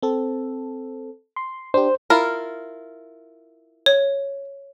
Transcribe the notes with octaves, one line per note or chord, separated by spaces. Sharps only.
C4 A4
C6
D4 G4 C5
E4 F4 A#4
C#5